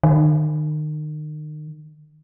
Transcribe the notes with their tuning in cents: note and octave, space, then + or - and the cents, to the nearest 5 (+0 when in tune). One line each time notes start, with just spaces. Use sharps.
D#3 -35